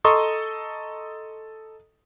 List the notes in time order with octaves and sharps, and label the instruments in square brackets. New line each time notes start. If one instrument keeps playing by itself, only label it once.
[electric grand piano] A4 D#5 A#5 C6 C#6 D#6